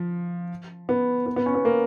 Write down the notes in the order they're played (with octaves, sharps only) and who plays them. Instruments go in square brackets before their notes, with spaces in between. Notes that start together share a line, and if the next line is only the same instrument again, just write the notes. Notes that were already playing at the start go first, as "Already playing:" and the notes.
Already playing: [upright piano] F3
B3
B3
B3
C#4
B3
A#3